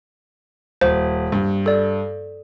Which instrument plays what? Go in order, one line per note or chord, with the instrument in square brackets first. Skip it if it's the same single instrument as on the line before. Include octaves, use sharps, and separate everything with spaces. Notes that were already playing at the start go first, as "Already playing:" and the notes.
[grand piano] D#1 [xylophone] C5
[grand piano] G2
[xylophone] A4 D5